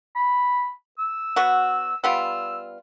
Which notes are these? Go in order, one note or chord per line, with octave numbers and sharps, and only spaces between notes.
B5
E6
F#3 B3 F#4
G3 B3 F4 E6